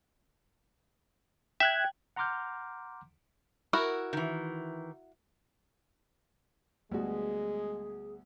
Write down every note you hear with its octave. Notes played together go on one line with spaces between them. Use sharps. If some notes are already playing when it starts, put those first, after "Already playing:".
E5 G5 F#6 G#6
F#5 A#5 C6 D6 F6 G6
E4 F#4 A#4
D#3 E3
D2 G3 G#3 B3 F#4 G#4